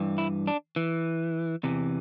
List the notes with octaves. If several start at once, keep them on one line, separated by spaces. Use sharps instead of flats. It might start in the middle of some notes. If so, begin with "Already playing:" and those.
Already playing: G2 E3
E4
D4
E3
E2 C3 E3